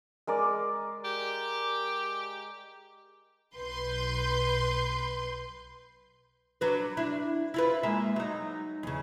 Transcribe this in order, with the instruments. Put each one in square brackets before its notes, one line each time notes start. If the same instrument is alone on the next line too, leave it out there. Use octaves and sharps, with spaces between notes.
[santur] G#3 A#4 D5
[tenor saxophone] G4
[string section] B1 B4 C6 G6
[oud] F#3 D4 B4
D4 E4
E4 F4 B4
G#3 A#3 E5
F#3 D#4
E2 C#3